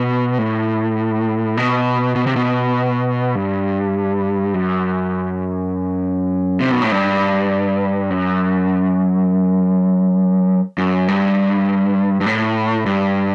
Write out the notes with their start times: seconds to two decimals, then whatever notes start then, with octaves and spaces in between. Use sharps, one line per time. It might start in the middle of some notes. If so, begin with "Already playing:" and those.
Already playing: B2
0.38 A2
1.57 B2
2.16 B2
2.27 C3
2.36 B2
3.35 G2
4.54 F#2
6.60 C3
6.71 B2
6.82 A2
6.92 G2
8.10 F#2
10.78 F#2
11.08 G2
12.21 G2
12.26 A2
12.86 G2